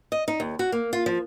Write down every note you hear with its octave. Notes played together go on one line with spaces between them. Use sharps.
D#5
D#4
D#2
F#4
A#3
F4
F3